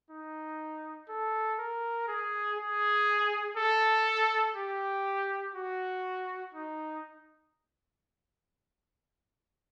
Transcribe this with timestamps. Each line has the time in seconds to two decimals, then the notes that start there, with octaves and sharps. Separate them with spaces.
0.10 D#4
1.09 A4
1.59 A#4
2.08 G#4
2.58 G#4
3.57 A4
4.56 G4
5.55 F#4
6.54 D#4